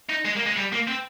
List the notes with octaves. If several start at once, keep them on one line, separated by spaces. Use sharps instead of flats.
D#4
G#3
A#3
G#3
G3
A#3
C4